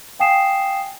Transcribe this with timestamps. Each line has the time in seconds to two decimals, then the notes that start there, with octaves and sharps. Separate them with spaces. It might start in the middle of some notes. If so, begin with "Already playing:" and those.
0.19 F5 G5 G#5 D#6 C7 E7